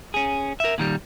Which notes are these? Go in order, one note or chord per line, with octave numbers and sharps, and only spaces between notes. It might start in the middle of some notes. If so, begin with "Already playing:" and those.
C#4 G#4
A#4 E5
A#2 D#3 G3